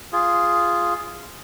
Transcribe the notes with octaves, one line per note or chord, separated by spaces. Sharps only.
F4 G#4